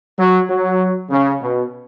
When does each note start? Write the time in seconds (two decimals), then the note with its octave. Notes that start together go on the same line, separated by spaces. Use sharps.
0.17 F#3
0.48 F#3
1.10 C#3
1.41 B2